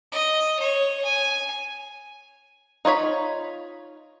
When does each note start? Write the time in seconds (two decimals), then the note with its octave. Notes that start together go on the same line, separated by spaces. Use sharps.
0.12 D#5
0.59 C#5
1.05 G#5
2.85 D#4 F4 C#5 B5